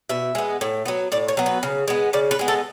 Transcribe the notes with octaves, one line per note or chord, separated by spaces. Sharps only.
B2 E5
G#3 B3
A2
F#3 B3
A2 D5
C#5
F#3 B3
B4
C#3
G#3 B3
C#3 D5
B4
G#3 B3
A4